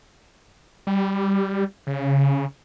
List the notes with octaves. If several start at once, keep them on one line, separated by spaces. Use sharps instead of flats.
G3
C#3